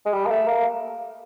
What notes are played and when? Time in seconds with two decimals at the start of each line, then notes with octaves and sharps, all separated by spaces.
0.06 G#3
0.13 G3
0.26 A#3
0.30 A3
0.48 A#3